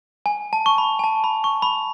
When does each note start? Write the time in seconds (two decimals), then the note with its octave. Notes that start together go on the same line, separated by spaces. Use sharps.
0.26 G#5
0.53 A5
0.66 C#6
0.78 B5
0.99 G#5
1.04 A5
1.24 B5
1.44 C#6
1.62 B5